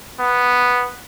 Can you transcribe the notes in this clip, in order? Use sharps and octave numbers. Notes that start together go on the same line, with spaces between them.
B3